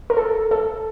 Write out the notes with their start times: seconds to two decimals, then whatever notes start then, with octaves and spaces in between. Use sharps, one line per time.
0.10 A#4
0.17 A4
0.51 A4